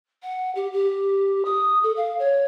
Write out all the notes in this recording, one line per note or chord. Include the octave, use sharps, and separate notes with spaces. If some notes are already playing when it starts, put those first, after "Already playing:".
F#5
G4
G4
D#6
A4
F5
C#5